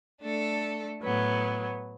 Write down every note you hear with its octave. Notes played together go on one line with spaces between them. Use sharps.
A3 D4 A4
A2 F#3 B3